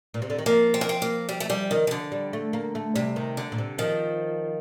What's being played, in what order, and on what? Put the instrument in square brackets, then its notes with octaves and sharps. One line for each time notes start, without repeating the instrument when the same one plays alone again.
[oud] A#2
C3
D3
D#3
[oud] F3 [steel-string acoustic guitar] A#3
[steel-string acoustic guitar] C4
A#3
C4
A#3
G3
A3
G3
D#3
D#3
D3
[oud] G3
A3
A#3
A3
[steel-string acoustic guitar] C3 [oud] G3
[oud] D#3
[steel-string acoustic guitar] D3
[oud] A#2
C3
[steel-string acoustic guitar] D#3 [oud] F3